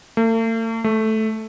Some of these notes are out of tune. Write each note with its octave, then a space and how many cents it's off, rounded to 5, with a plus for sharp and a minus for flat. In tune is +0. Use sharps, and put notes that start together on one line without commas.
A3 +45
A3 -5